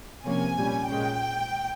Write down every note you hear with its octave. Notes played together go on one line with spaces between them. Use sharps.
C3 F3 A#3 C#4 G#5
A#2 G3 C#4
A#2 G#3 C#4 G5